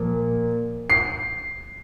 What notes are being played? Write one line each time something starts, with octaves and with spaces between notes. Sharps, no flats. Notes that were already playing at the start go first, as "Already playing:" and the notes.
Already playing: A#2 F3 A#3
C7